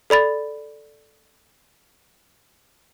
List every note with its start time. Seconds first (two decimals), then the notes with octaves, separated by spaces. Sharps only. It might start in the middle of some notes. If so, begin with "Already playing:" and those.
0.10 A4 D5 B5 A6